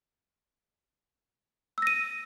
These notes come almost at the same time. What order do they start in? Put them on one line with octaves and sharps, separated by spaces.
E6 A#6 D#7